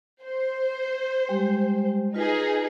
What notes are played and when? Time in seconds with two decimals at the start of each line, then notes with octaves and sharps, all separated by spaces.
0.22 C5
1.29 G3 G#3 G4
2.14 D#4 F4 G#4 B4